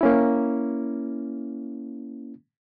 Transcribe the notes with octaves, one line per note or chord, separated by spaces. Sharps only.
A#3 C#4 E4